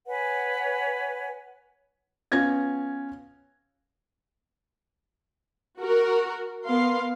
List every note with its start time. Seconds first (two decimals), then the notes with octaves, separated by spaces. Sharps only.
0.07 B4 C#5 F#5 G#5
2.32 B3 C#4 F4 G#6 A#6
5.79 F#4 A#4
6.66 B3 A#4 F5 C6